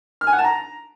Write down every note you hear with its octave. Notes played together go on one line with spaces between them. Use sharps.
F6
G#5
F#5
A5
A#5